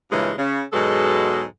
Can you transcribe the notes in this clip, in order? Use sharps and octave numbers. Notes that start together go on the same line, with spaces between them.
G2 A#2 C#3 E3 G#3 C#4
C#3
E2 G#2 B2 F#3 G#3 A4